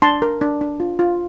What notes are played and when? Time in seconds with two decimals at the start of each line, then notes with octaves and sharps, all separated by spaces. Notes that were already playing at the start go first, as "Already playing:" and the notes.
0.02 D4 A5 C6
0.22 A#4
0.41 D4
0.61 D4
0.80 F4
0.99 F4